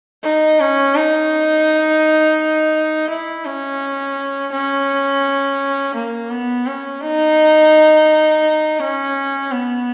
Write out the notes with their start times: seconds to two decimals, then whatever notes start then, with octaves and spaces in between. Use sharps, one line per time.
0.23 D#4
0.60 C#4
0.95 D#4
3.09 E4
3.45 C#4
4.52 C#4
5.95 A#3
6.30 B3
6.66 C#4
7.01 D#4
8.80 C#4
9.52 B3